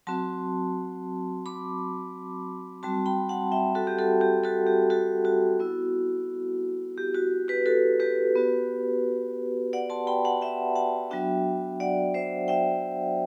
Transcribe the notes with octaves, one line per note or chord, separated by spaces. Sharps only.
F#3 C4 F#4 A5 C6
B5 D6
G3 C4 F#4 A5 C6
G5 B5
F#5 A5
E5 G5
F#4 A4
G4
F#4 A4
G4
F#4 A4
G4
F#4 A4
F#4
B3 E4
G4
F#4
G4 B4
F#4 A4
G4 B4
B3 F#4
D5 F#5
A5 C6
G5 B5
F#5 A5
E5 G5
F#5 A5
F#3 B3 D4 F#4 E5 G5
D5 F#5
C5 E5
E5 G5